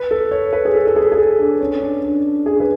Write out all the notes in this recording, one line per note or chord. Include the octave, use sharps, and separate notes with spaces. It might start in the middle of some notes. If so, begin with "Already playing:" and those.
Already playing: B4
A4
C#5
B4
G#4
A4
A4
G#4
G#4
A4
D4
C#4
D4
D4
G#4
B4